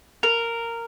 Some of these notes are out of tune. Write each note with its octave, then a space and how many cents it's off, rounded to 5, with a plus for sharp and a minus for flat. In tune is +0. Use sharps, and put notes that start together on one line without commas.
A#4 -10